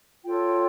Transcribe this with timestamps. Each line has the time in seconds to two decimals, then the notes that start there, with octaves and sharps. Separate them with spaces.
0.24 F4 A4 C#5 G5